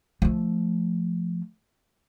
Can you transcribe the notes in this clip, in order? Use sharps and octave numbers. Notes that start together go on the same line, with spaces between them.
F3 A3